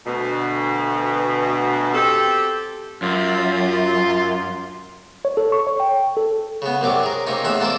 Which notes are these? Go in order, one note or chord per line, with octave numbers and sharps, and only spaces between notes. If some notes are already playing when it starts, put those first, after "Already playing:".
D2 B2
C4 G4 A4
F#2 F4
C#5
A4
C#6
C#5
G5
A4
C#3 B3
C2 F#2 C3 F#3 D6
G#4 A#4
C3 A#3 C#4 D#4
A1 E2 E3 E5 F5
F4 A4 A#4 C5 D5